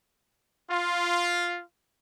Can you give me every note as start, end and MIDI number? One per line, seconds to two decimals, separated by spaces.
0.69 1.62 65